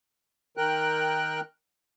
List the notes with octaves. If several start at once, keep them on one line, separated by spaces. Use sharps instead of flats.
D#3 A#4 G5 F#6